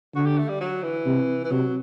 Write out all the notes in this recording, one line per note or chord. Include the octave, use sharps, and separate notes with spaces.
D3 F#4
G4
A3
G3
F#3
E3
C3
E3
C3 F#3